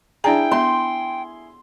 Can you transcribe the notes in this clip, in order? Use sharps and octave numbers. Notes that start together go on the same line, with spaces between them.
D4 E4 G#4 D5 G5 A#5
B3 E5 C6